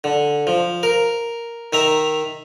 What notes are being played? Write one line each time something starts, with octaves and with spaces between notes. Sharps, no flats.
D3
F3
A#4
D#3 E5 A#5